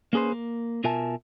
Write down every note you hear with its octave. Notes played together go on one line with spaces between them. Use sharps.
A#3 C#4 G#4 B4 C5
A#3
B2 F4 A#4 E5 G#5 A5